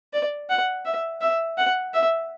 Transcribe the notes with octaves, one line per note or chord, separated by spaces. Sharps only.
D5
F#5
E5
E5
F#5
E5